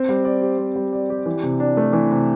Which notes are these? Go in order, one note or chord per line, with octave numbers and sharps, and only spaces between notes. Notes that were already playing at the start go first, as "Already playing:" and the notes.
Already playing: C4
G3
D5
G4
C4
G3
D5
G4
E3
C3
D4
A3
E3
C3